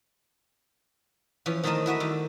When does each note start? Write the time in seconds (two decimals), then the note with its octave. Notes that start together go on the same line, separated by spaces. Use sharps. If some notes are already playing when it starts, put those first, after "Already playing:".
1.46 E3 F3 C#4
1.63 D#3 A3 C4 A#4 D#5 A5
1.86 E4 F#4 D#5 E5
2.00 D#3 G3